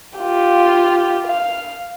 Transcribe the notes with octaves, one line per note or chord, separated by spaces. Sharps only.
F4 G4
F5